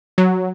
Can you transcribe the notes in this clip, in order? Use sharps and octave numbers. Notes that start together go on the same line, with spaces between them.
F#3